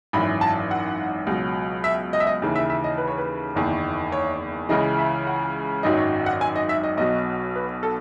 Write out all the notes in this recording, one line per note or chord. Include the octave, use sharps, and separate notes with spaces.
G#1 F#2 E3 B5
A5
F#5
C#2 B2 F#3
E5
D#5
E5
D#5
D#2 C#3 E3
E5
E5
D#5
B4
C#5
B4
F#1 E2 D#3
C#5
C#2 C#3 E3 D#5
E5
F#5
G#1 F#2 D#3 F#3 D#5
C#5
F#5
G#5
D#5
E5
D#5
B1 B2 F#3 D#5
B4
A4